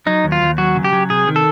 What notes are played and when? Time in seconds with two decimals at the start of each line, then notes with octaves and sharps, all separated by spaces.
0.06 F#3 D#4
0.24 D#2
0.32 F4
0.41 D#2
0.58 F#3 F#4
0.76 C#3
0.84 G4
0.93 F#3
1.10 C3 G#4
1.28 D#3
1.36 A4